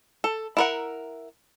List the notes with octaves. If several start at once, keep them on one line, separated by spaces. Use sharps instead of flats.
A4
E4 A#4 F#5